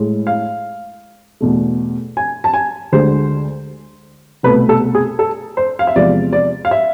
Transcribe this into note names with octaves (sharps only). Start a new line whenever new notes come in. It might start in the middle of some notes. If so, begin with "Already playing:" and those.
Already playing: A2 G#3
F5
E2 B2 A3
G#5
A5
G#5
D2 D3 G#3 C5
C2 B2 A3 B4
A4
G#4
A4
C5
F5
E5
E2 C3 F3 G#3 D5
D5
F5
E5